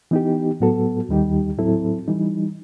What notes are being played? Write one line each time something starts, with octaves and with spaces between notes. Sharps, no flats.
E3 B3 D#4 G4
A2 F#3 B3 F#4 A4
D#2 D#3 G3 D#4 G4
A2 F#3 C4 E4 A4
E3 G3 D#4